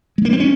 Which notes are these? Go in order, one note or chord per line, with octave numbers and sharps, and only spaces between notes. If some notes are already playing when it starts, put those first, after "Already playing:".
G#3
A#3
C4
C#4